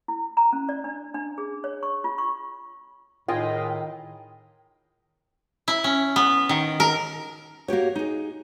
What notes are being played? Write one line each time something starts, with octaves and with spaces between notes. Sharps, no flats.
E4
A#5
C#4
D5
D4
D4
G#4
C#5
C#6
F4
C#6
A2 D#3 F4 G#4 D#5 G5
E4
C#4
B3
D#3
A#4
A#3 F#4 G4 C#5
D#4 G#4